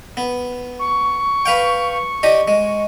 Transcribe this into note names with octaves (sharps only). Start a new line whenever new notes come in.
B3
C#6
B4 F5 G5
D4 G4 D#5
G#3